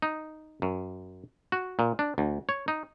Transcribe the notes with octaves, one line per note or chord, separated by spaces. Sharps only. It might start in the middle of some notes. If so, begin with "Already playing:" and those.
D#4
F#2
F#4
A#2
D4
D2
C#5
D#4